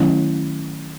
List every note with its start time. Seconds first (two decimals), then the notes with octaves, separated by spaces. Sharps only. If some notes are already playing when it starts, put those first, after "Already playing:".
Already playing: D#3 F#3 A3 C#4 E4